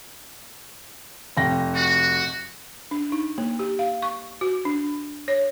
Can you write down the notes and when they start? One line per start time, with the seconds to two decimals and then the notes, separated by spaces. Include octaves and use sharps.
1.37 F1 G5 A#6
1.74 F#4
2.91 D4
3.12 D#4
3.38 A#3
3.59 G4
3.79 F5
4.02 C#6
4.41 F#4
4.65 D4
5.28 C#5